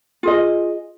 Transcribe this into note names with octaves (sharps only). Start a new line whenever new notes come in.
F4 G#4 D#5